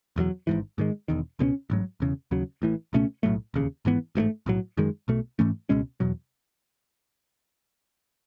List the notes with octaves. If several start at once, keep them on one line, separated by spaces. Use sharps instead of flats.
E1 E2 D#3 F#3
G#1 G#2 E3
G#2 D#3 G#3
E1 E2 D#3
C#2 B2 G#3 C#4
A1 G#2 F#3
E1 E2 C#3
D#2 C#3 F#3
A1 A2 E3
C#2 B2 A3 C#4
B1 A2 F#3 A3
E1 D#2 C#3
G#1 G#2 E3 B3
A1 G#2 E3 A3
B1 A2 F#3
F#2 D#3 G#3
B1 B2 A3
G#2 E3 A3 C#4
C#2 B2 G#3 C#4
E2 B2 F#3